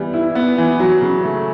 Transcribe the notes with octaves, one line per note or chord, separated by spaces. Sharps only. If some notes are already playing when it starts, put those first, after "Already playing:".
Already playing: E3 G3 B3
E4
B3
E3
F#3
C#3
A3